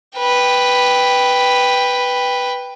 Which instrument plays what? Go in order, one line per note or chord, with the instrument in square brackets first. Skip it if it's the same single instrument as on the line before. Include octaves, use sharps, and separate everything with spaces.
[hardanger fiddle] B4 G5